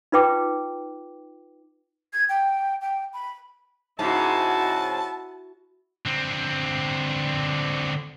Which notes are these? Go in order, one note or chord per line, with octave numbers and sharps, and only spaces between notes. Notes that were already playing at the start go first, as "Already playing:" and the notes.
D#4 F4 B4 G5 D6
G#6
G5
G5
B5
G#2 C#3 E4 F#4 A5
D3 C4